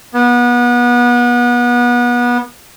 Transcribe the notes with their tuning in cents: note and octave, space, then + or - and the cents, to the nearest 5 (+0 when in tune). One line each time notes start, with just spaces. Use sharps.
B3 -30